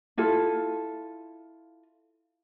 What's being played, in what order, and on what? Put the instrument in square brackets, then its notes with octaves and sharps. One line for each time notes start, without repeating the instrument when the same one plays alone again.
[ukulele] E4 F4 A4